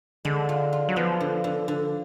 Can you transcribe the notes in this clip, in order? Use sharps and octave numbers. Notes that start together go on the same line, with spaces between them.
D3 G#3
F4
F4
F#3
F3 B3
D3
D3
D3